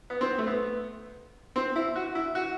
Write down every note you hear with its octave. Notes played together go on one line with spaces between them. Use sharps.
B3
C4
A3
B3
C4
E4
F#4
E4
F#4